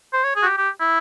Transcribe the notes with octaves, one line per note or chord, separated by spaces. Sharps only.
C5
C#5
G#4
F#4
G4
G4
E4